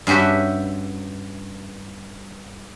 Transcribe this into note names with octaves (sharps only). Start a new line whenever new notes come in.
G2 C#4 F#4 G4 E5